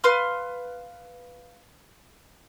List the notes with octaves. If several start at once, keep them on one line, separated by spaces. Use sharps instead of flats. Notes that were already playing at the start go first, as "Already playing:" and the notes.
B4 F5 C6 F6